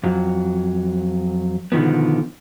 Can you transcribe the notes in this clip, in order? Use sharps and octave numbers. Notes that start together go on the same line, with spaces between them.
F2 F#3
B2 D3 D#3 F3 B3